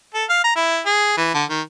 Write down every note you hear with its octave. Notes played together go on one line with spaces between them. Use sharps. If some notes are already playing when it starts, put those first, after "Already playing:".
A4
F5
A#5
E4
G#4
E3
D3
D#3